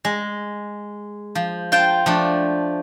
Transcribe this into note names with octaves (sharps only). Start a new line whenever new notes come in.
G#3
F3
F4 C5 G5 A5
F3 A3 D4